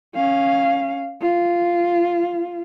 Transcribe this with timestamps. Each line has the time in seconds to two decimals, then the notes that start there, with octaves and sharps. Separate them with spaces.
0.15 C#4 F5
1.22 F4